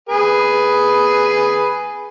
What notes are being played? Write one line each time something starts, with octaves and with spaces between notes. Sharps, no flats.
G#4 B4